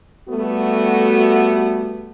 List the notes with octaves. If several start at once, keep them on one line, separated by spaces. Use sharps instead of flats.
G3 A3 B3 F#4 A4